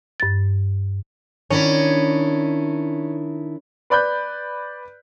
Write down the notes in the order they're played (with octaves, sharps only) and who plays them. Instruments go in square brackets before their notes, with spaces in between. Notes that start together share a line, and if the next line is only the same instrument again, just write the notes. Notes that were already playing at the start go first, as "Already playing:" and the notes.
[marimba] G2 A6
[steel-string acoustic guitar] D#3 D4 E4 [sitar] C#4
[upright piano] B4 D5 B5 F#6 G6